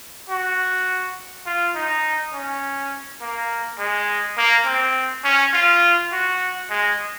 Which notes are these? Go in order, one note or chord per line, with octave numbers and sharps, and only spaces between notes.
F#4
F4
D#4
C#4
A#3
G#3
A#3
C4
C#4
F4
F#4
G#3